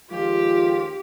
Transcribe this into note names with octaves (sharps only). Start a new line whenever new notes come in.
D#2 F3 G#3 F4 G4